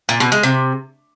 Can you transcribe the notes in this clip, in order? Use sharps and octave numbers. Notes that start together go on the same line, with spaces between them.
A#2
B2
G#3
C3